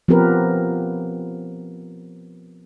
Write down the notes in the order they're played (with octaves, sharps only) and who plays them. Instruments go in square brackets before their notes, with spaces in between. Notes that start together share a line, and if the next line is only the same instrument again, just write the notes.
[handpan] F3 B3 C4 G4 A#4 B4